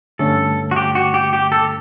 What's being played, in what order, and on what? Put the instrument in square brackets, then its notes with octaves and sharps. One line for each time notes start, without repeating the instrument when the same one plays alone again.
[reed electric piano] G2 D3 A3 C#4 [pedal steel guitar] A4
[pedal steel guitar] F#4
G4
F#4
G4
G4
A4